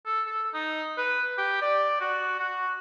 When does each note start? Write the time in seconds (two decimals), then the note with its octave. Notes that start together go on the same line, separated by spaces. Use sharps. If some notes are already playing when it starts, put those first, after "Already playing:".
0.06 A4
0.26 A4
0.54 D#4
0.98 B4
1.38 G4
1.62 D5
2.00 F#4
2.39 F#4